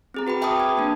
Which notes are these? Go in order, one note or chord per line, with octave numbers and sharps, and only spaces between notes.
C4 G#4 A#5
F#4 B4 G5 B5
E5 G5 A5 B5 D6 D#6
G#6
A#3 D4